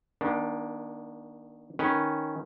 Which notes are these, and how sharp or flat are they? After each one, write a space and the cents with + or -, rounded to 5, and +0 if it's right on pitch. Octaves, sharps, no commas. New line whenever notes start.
D#3 +5 A#3 +45 D4 +0
D#3 +0 C#4 +0 B4 +0